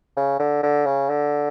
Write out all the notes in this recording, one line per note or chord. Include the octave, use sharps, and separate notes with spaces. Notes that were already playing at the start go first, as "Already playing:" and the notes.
C#3
D3
D3
C#3
D3